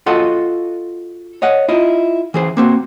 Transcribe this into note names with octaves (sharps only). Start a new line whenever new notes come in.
F4 F#4 A4 D#5 F5 F#5
C#5 D#5 F#5
E4 F4 D#5
E3 G#4 C5
A#3 C4 F#4